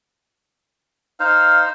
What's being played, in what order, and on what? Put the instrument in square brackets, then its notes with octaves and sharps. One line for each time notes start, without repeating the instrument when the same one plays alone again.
[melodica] D#4 C5 [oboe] F5